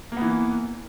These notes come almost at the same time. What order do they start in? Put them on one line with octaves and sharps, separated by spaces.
A#3 B3 E3